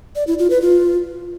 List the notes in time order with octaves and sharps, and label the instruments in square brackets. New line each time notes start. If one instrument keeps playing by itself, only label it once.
[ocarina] D5
E4
F4
B4
F4